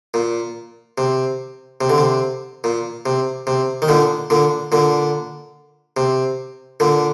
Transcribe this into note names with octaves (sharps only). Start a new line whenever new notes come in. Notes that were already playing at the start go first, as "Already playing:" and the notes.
A#2
C3
C3
D3
C3
A#2
C3
C3
D#3
A#2 D3
A#2 D3
A#2 D3
C3
A#2 D3